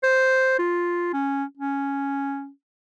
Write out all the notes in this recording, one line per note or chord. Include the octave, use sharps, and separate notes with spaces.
C5
F4
C#4
C#4